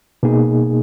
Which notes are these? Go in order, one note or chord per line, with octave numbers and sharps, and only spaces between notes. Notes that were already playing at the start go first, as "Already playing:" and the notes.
B2 A#3 D#4 G#4